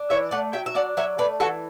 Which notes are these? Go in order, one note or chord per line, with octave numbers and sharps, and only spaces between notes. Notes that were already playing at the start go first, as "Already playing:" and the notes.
Already playing: D4
E3 C#5 E5
A3 D5 F#5
F#3 E5 G5
E5
D4 D5 F#5
F#3 C#5 E5
A3 B4 D5
E3 F#4 A4